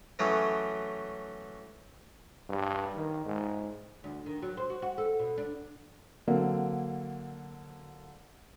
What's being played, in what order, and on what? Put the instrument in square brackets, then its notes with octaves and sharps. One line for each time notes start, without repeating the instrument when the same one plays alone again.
[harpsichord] E3 F#3 A3 C#4 G#4
[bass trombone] G2
D#3
G#2
[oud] D2
D#3
F#3
C5
F#4
F#4
A4
B2
D4
[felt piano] D3 F#3 A#3 C4